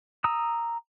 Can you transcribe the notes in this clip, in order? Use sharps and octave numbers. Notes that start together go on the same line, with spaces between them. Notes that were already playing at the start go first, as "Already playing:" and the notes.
A#5 D#6 E6